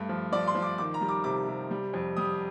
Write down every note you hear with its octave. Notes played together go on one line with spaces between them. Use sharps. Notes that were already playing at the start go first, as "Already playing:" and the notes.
Already playing: G2 A3
F3
F3 D5
C6
F3
D6
D#3 D6
A#5
G3
D6
C3 D6
C3
G3
F2
G3 D#6